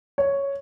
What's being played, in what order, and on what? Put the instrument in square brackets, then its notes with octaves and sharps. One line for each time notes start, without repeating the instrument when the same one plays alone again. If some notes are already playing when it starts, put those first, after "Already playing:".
[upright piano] C#5